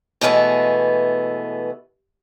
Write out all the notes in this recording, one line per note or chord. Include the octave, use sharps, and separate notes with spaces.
B2 E3 G#3 A3 B3